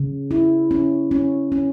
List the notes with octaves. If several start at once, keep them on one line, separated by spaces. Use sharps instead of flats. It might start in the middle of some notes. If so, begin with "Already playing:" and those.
Already playing: C#3
E4
C#4
C#4
C#4